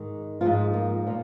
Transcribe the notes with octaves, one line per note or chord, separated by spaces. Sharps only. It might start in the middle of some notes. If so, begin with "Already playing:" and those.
Already playing: G#2 D#3
G#2 F3 F4
A#3
A#2 F3